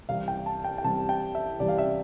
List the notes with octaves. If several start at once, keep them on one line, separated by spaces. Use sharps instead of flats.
C2 C3 E3 G3 F5
G5
A5
G5
G5
C2 C3 E3 G3 A5
G5
E5
C2 C3 E3 G3 D5
F5
E5